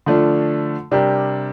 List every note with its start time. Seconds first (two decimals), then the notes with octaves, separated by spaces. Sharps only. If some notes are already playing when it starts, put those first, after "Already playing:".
0.06 D3 F3 A3 D4 F4
0.91 C3 G3 D4 G4 A#4